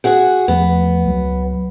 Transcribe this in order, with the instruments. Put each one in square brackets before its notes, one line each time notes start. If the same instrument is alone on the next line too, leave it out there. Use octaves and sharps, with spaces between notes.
[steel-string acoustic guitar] F#4 G#4 F#5
[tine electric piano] E2 F3 A3 [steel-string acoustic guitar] B3
[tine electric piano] C#2 F#3